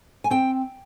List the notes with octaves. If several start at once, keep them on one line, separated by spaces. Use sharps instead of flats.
G#5
C4 G5